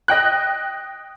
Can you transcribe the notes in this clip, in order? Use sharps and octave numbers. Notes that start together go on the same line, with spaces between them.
D#5 G5 F#6